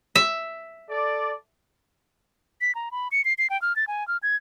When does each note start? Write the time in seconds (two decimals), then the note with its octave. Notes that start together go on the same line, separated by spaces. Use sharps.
0.15 E5
0.88 A4 D5
2.61 B6
2.75 A#5
2.92 B5
3.12 C#7
3.25 C7
3.38 C7
3.50 G5
3.62 F6
3.76 A6
3.88 G#5
4.08 F6
4.23 G#6